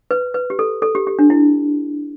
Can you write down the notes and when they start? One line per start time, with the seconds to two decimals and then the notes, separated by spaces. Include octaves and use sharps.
0.11 B4
0.34 B4
0.50 G4
0.59 A4
0.82 A4
0.95 G4
1.07 G4
1.19 D4
1.30 E4